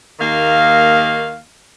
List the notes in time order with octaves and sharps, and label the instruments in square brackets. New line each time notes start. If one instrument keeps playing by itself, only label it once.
[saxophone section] D#2 D#3 A#3 F5